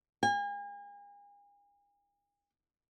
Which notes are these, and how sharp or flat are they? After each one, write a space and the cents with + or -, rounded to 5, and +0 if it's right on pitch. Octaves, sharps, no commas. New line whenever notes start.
G#5 -40